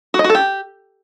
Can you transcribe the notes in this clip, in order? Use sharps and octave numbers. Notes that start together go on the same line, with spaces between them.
F#4
D#5
F#4
A4
G4